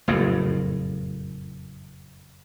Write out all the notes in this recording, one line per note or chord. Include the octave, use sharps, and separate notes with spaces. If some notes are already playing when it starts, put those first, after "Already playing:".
F#1 F2 A2